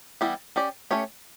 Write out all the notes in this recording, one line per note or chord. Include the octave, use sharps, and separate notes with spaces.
E3 G3 B3 E4 G4
C#4 G4 D5
A3 C#4 G4 C#5